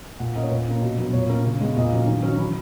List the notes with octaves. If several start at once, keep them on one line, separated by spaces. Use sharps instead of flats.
A#2 F#5
A#3 C#4 D#5
C#5
A#2 B4
A#3 C#4
B2
F#3 B3
A#2 C#5
A#3 C#4
C#3
G#3 B3
A#2 D#5
F#3 C#4
D#3
F#3 C#4
E3 B5